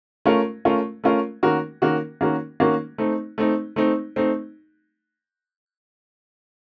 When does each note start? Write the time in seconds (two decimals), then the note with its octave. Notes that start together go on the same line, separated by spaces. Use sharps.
0.25 A3 C#4 F4 A#4
0.65 A3 C#4 F4 A#4
1.04 A3 C#4 F4 A#4
1.43 D#3 A#3 C#4 F#4 A#4
1.82 D#3 A#3 C#4 F#4 A#4
2.21 D#3 A#3 C#4 F#4 A#4
2.60 D#3 A#3 C#4 F#4 A#4
2.98 A3 C4 D#4
3.38 A3 C4 D#4
3.76 A3 C4 D#4
4.16 A3 C4 D#4